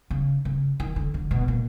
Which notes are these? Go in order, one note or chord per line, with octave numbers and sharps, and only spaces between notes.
C#3
C#3
D#3
D3
D3
B2
A#2